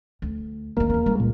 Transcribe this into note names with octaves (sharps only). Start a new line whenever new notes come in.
D2
E2 D#3 A#3
E2 C#3
C#2 G3
A#2